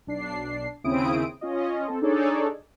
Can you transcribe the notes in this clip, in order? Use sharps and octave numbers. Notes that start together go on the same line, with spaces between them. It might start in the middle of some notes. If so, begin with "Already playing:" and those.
B1 D4 C7
D#2 C#3 C4 E4 D#6 D7
C#4 F4 D#5
C4 A4
D4 D#4 G#4 A4 C#5 D5